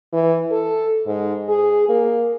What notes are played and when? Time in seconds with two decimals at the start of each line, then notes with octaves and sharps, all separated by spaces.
0.13 E3
0.51 A4
1.06 G#2
1.49 G#4
1.89 A#3